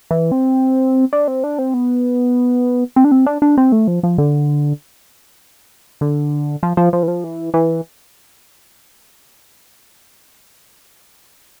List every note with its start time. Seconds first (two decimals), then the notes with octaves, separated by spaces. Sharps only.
0.11 E3
0.32 C4
1.13 D4
1.28 C4
1.44 D4
1.59 C4
1.74 B3
2.96 C4
3.04 D4
3.11 C4
3.26 D4
3.42 D4
3.57 C4
3.72 A3
3.88 F3
4.03 F3
4.18 D3
6.01 D3
6.63 F3
6.77 F3
6.93 F3
7.03 E3
7.08 F3
7.24 E3
7.54 E3